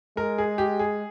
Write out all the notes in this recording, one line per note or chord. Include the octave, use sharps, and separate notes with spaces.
G#3 A#4
G#4
G4
G#4